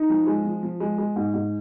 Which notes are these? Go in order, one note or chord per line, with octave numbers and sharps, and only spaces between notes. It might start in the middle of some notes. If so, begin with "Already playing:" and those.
Already playing: D#4
F3
G#3
F3
F3
G#3
G#3
G#2
G#2